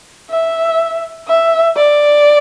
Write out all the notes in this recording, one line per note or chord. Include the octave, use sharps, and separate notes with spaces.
E5
E5
D5